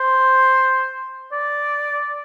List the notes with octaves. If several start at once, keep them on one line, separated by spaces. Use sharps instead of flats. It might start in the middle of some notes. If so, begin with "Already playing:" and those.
Already playing: C5
D5